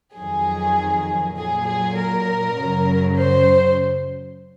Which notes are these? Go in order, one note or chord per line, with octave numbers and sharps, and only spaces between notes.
F2 D#3 F#3 G#4
A#2 F#3 G#4
G#4
A#4
F#2 C#3 F#3
C5